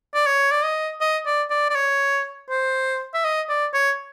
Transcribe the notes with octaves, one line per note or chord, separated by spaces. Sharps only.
D5
C#5
D5
D#5
D#5
D5
D5
D5
C#5
C5
E5
D#5
D5
C#5